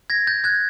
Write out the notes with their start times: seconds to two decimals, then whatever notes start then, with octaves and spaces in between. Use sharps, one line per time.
0.10 G#6 A#6
0.27 G6 A6
0.44 F#6 G#6